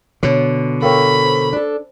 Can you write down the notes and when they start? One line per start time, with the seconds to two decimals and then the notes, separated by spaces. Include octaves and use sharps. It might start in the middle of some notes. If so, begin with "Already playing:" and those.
0.23 B2 D3 C#5
0.82 A4 A#4 C#5 F5 G5 B5 C#6
1.24 C5
1.53 D4 A4